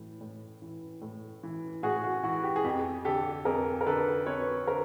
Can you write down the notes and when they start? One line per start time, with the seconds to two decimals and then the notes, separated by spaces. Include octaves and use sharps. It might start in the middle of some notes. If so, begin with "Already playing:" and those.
Already playing: A2 E3
0.21 A2
0.62 E3
1.02 A2
1.43 E3
1.83 A2 F#4 G#4
2.04 F#4
2.23 E3 F#4
2.44 G4
2.56 G#4
2.64 F2 G4
3.05 D3 G4 A4
3.45 F2 G#4 A#4
3.81 A#4
3.86 D3 A4 B4
4.26 F2 B4 C#5
4.67 D3 A#4 C5